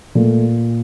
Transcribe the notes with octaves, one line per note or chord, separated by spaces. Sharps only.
A#2 A3